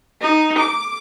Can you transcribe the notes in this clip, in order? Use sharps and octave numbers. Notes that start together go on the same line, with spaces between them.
D#4
D6